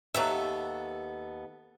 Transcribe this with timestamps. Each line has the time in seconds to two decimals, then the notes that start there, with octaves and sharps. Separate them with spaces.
0.14 D#2 F#3 B3 A4 E5